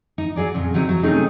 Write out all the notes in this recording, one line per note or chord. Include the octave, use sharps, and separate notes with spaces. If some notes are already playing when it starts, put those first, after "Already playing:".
D#4
F#3 G#4 D5
F2 A#2 C#3
F3 F#3 C4 D#4 E4
F#3
C3 D#3 A3 C#4 D#4 G#4